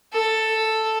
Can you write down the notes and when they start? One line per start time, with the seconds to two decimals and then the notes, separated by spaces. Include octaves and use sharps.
0.13 A4